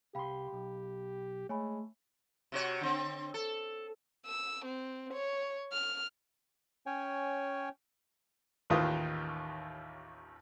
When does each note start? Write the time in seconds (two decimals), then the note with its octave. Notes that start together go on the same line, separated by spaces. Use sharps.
0.15 C2 G4 F5 G5 B5 C6
0.53 B1
1.49 G#3 A3 C#5 G#5 B5
2.52 C3 F#4 C#5
2.81 D3 C4
3.34 A4
4.26 E6
4.65 C4
5.13 C#5
5.72 F6
6.86 C#4 C#5 G5 G#5
8.70 A1 D#2 D#3 F4 B4 D#6